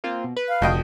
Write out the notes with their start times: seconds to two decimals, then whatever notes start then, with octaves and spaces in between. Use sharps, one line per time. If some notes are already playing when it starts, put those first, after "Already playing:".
0.04 A#3 C4 F4
0.24 B2
0.37 B4
0.49 F5
0.62 F1 D2 D#5 G5